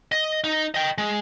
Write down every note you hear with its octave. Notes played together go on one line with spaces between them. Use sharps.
D#5
D#4
D#5 G5
G#3